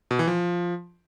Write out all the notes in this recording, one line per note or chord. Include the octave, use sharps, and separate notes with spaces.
B2
E3
F3